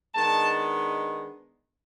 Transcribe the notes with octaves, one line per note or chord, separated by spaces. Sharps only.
D#3 G#3 B3 D4 A5